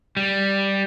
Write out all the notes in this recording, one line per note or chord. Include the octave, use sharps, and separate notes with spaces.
G3